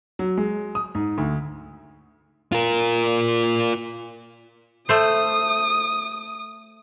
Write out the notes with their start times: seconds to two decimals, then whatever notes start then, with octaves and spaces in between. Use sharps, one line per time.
0.19 F#3
0.37 G#3
0.75 D#6
0.95 G#2
1.18 D2
2.52 F4 A#4
4.89 A3 C5 D#6